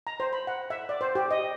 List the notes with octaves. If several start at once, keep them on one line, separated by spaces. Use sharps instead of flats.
A#5
C5
B5
F#5
E5
D5
C5
G4
D#5